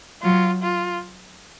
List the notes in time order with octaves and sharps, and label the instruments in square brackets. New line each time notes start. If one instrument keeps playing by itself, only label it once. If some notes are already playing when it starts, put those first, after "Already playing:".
[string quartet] F#3 [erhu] F4
[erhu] F4